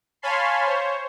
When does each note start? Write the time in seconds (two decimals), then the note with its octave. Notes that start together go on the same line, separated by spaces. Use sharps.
0.22 C#5 F5 G#5 A5 B5 C6
0.66 C5 C#5